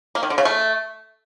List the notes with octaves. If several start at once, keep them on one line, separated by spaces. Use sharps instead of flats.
A#3
D#3
D3
C#3
A3